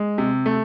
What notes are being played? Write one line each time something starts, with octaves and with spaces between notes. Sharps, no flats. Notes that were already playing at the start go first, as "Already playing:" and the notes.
Already playing: G#3
C3
A3